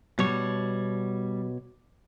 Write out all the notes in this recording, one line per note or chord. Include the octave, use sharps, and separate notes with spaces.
B2 G3 C#5